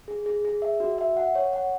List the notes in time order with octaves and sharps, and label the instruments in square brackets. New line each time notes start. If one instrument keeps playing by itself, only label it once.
[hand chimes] G#4
G#4
G#4
E5
F#4
E5
F#5
C#5
F#5